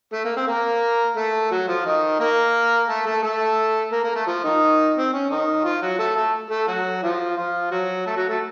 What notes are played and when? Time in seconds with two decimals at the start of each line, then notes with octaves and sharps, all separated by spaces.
0.13 A3
0.25 A#3
0.36 C4
0.47 A#3 A#4
1.17 A3 A4
1.51 F#3 F#4
1.68 F3 F4
1.85 D#3 D#4
2.20 A#3 A#4
2.88 A3 A4
3.06 A3 A4
3.23 A3 A4
3.92 A#3 A#4
4.04 A#3 A#4
4.15 A3 A4
4.27 F3 F4
4.44 D#3 D#4
4.96 C4
5.13 C#4
5.30 D#3 D#4
5.64 F3 F4
5.81 F#3 F#4
5.98 A3 A4
6.16 A3 A4
6.50 A3 A4
6.67 F#3 F#4
7.03 F3 F4
7.37 F3 F4
7.71 F#3 F#4
8.06 A3 A4
8.17 F#3 F#4
8.29 A3 A4